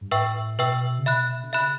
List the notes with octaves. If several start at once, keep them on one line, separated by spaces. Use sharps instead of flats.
G2
A2 B4 E5 G5 C#6 E6
B2 B4 E5 G5 C#6 E6
C#3
B2 E5 B5 F#6
D3
C#3 E5 B5 F#6